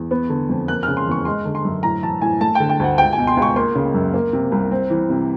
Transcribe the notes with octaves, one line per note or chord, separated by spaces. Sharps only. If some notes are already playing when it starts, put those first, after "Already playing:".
Already playing: E2
B3
D3
F2
A#3 F#6
C#3 F6
C6
E2 C#6
G#3 C6
D3
C6
F#2
A2 A#5
E3 A5
A2 G#5
A3 A5
D3 G5
G5
D2 F#5
C#2 G5
G#5
B2
C6
C#2
C#6
A#3 C6
C#3
F#2
A#3
C3
C2
C4
E3
C3